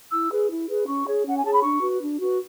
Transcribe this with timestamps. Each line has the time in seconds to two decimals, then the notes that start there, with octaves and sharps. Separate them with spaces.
0.11 E4 E6
0.30 G#4 B4
0.49 E4
0.68 G#4 B4
0.87 C#4 C#6
1.06 G#4 C#5
1.25 C#4 F#5
1.36 G#5
1.43 G#4 C#5 A5
1.53 B5
1.63 D4 C#6
1.82 F#4 B4
2.00 D4
2.19 F#4 B4